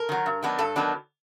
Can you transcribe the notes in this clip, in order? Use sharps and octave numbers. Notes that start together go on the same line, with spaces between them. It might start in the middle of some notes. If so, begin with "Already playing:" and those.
Already playing: A#4
D#3 F#3
G2
D#3 F#3 B3 D4
G2 A4
D#3 F#3 B3 D4